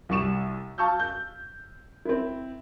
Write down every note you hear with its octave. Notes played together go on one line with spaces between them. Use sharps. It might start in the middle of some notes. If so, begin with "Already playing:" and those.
C2 G3 C#6 E7
F5 A5 C#6 E6 G6
G6
C4 E4